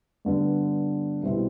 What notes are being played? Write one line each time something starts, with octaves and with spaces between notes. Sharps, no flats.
G2 D3 G3 B3
C2 B2 G3 C4 E4